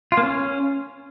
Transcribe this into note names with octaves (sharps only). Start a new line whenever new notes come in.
F4
A#3
C#4